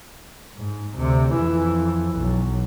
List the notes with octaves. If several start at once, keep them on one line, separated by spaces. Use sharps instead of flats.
G#2
D2 C3
F2 E3
B1